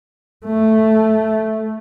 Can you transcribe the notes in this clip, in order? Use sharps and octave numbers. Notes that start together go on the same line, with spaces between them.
A3